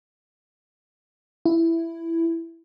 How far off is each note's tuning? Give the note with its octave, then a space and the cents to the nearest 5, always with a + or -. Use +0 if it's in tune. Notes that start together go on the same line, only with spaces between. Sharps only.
E4 +5